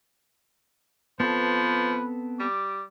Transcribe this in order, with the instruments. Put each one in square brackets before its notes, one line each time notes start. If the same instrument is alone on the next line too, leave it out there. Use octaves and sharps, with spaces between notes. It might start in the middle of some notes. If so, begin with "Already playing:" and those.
[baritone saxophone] F3 [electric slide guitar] B3 C4 A4 [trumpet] B4
[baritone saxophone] G3 [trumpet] D6